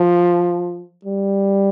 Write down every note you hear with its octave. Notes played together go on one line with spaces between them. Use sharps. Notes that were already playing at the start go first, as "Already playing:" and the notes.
Already playing: F3
G3